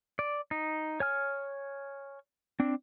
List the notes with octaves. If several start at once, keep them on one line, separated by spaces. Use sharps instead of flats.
D5
D#4
C#5 G#5 F6
C4 D4